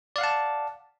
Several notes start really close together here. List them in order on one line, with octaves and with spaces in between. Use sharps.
D5 F5 F#5 A5